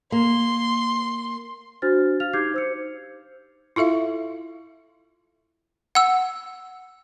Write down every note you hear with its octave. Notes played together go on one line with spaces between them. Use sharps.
A#3 C6
D4 F#4 C5 F6 A6
F5 F6 F7
D#4 G4 D6 G6 G#6 C7
C5 E6 C#7
E4 F4 A4 E5 F5
F#5 E6